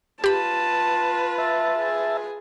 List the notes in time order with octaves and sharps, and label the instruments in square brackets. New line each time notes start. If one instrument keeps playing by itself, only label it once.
[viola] F4 B4 [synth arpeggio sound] G4 B5 [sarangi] A5
[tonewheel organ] E5 A5
[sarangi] G#4